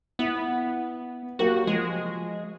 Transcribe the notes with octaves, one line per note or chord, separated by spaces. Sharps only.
B3 E4
F#3 A#3 F#4 G4
F3 G#3